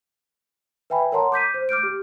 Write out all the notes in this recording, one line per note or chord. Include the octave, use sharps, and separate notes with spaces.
B4 E5 G5 G#5 B5
A#4 C#5 F#5 A5 A#5 C6
D6 G6 B6 D#7
C5
D6 F6 G6 D7
G4